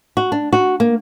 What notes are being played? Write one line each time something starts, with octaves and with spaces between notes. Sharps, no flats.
F#4
D4
F#4
A#3